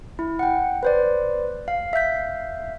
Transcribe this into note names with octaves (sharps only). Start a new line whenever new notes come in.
E4
F#5 G5
B4 C5 D5
F5
E5 F5 G6 B6